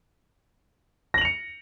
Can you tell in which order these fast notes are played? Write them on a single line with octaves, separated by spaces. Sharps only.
A#6 F#7 F7 C#7